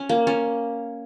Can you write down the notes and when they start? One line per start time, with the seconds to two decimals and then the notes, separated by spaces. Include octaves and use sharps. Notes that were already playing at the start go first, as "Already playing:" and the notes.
Already playing: C#4
0.09 A#3
0.27 C#4